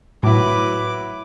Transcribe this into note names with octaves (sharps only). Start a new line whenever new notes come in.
A2 F#3 E4 B4 D6